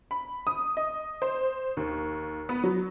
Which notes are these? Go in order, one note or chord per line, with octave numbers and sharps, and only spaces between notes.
B5
D#6
D#5
C5
D#2
B3
F#3